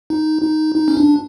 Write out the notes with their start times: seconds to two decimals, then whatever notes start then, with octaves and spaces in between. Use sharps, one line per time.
0.10 D#4
0.43 D#4
0.76 D#4
0.88 C#4
0.97 D4